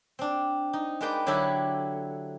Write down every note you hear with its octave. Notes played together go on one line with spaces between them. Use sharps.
C4 D4
D#4
G#3 A#3 D#4 B4 D5 G5
D3 F#3 D4 E4 G4 A4